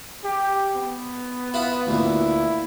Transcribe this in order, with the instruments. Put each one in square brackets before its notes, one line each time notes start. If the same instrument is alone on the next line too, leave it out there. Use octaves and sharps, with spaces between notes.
[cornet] G4
B3
[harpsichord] E4 F4 B4
[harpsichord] D2 A#2 [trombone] E4